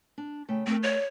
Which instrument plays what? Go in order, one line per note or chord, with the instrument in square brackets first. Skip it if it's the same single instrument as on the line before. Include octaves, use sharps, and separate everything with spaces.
[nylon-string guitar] D4
C#3 A3 G5
[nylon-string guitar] A3 A#4 [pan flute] C4
[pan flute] C#5